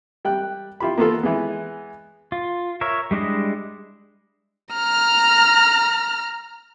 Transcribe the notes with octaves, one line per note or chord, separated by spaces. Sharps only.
G3 G5 F#6
E4 F4 G4 B5
A#3 B3 F4 A4
E3 G#3 B3
F4
A#4 C#5 E5
G3 G#3 D4 E4 D#5
A#5 F6